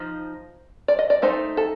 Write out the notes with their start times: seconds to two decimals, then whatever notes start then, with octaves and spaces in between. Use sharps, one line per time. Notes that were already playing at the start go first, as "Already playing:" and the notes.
Already playing: F3 D#4 C5
0.88 D5
0.99 D#5
1.10 D5
1.22 A3 D#4 C5
1.57 A4